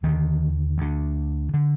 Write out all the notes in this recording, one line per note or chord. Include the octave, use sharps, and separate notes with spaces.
D#2 D3 D#3
D2 D3
D3